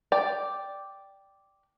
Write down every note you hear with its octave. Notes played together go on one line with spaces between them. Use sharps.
D5 G5